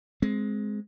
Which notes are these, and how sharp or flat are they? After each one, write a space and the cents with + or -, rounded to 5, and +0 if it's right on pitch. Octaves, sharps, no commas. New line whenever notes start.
G#3 +10 C4 +0